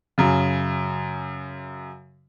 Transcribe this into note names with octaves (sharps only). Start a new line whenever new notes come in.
F#2 C#3